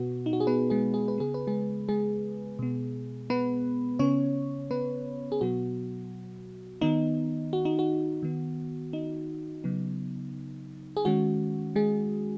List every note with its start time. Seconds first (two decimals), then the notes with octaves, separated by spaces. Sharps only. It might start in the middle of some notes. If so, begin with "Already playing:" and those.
Already playing: B2 B3 F#4
0.26 D#4
0.33 F#4
0.40 G#4
0.47 B3 B4
0.70 G#3 G#4
0.94 G#4
1.08 B4
1.18 C#3 B3 G#4
1.34 B4
1.47 G#3 G#4
1.89 G#3 G#4
2.59 B2 B3
3.30 B3 B4
3.99 C#3 B3 C#4 C#5
4.71 B3 B4
5.32 G#4
5.41 B2 F#3 B3 F#4
6.81 D#3 B3 D#4
7.53 F#4
7.65 D#4
7.79 F#4
8.23 D#3 B3
8.93 D#4
9.64 C#3 F#3 B3
10.97 G#4
11.05 D#3 G#3 C#4 F#4
11.76 G#3 G#4